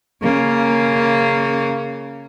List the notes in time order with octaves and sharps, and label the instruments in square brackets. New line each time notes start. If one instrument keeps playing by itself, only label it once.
[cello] C#3 A#3